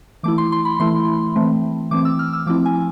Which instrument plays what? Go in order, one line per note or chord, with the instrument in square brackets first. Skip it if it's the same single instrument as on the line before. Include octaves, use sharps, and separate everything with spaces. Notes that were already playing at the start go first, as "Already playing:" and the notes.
[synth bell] E3 A3 E4 D6
C6
C6
B5
E3 A3 E4 C6
E3 A3 C4
E3 A3 C4 D6
E6
F6
E6
F3 A3 C4 E4 D6
G#5